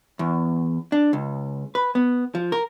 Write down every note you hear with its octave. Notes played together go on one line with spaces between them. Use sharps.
E2
D4
C#2
B4
B3
F3
A#4